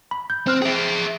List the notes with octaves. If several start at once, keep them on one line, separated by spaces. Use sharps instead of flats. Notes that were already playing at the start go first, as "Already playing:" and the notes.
B5
G6
C4 C5 F6 F#6
G#4 E5 G5 D7